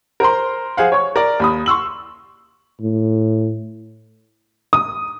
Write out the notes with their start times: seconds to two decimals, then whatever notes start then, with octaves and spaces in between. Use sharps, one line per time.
0.20 A#4 C5 A#5 C6
0.77 G#4 C5 F5 F#5
0.92 C#5 C#6
1.16 A#4 D5
1.40 D#2 B5 D#6
1.66 C6 C#6 E6 F#7
2.80 A2
4.73 D#6